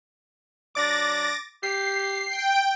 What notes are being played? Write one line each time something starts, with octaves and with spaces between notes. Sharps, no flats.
F#3 D4 D5 D6 A6 A#6
G4 C7
G5